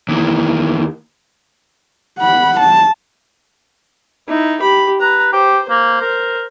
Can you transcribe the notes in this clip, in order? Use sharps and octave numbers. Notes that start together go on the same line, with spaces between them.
D#2 E3
F#5 B5
A5
D#4 E4
G4 B5
B4 A#5
G4 C5
A#3 C5
A#4